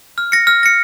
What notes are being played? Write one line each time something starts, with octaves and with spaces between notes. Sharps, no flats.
F6
A#6 C#7
F6
A#6 C#7